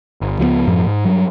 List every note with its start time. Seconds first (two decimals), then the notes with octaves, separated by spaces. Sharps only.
0.21 G1
0.39 C#2 F3 F#3 B3
0.67 F#2 A2 F3
0.86 G#2
1.05 G2 F#3